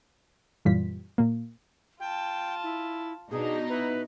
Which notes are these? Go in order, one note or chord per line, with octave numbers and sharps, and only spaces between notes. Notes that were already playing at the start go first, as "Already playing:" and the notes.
F#2 A#2 E3 G3 F4 B6
A#2 A#3
F4 G5 A5
E4
B2 D4 D#4 G#4
E4 B4